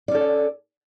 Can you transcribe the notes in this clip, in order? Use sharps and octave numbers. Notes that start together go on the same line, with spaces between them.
C#4 A4 D5